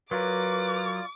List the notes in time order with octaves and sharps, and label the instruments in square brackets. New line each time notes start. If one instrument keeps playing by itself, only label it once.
[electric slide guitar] F#3 A#4 [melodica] F4 D5 [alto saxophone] B4 [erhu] D6